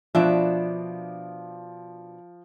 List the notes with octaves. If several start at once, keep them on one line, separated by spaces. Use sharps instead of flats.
B2 F3 D4 E5